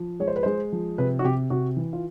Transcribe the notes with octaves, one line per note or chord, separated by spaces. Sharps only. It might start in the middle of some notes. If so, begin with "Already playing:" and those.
Already playing: F3
G#3 C#5
C5
B4
G#3 C5
F3
C3 B4
F#4
C3 G4
C3 F#4
E3
F4